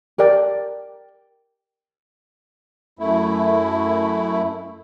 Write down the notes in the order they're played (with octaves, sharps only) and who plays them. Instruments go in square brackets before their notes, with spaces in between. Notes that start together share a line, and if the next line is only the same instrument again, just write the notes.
[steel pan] G4 D5 [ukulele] A#4 G5
[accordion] F#2 A3 E4